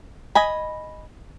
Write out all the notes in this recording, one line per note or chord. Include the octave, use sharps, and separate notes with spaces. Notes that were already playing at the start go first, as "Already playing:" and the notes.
D#5 G#5 B5